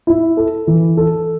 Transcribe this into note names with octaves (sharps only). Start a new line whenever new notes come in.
E4
A4
E3
A4